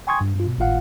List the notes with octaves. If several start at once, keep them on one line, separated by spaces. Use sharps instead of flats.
G5 G#5 C6 C#6 D#6 G#6
G2
G2 F4
B2
G#1 A2 F4 F5 F#5